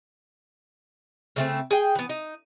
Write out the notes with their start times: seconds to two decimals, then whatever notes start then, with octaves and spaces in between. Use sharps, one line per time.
1.36 C#3 A3 C4
1.71 G#4 G5
1.95 E3 B3
2.09 D#4